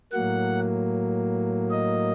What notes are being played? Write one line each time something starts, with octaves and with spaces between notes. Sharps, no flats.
A2 F#3 A#3 F#5
D#5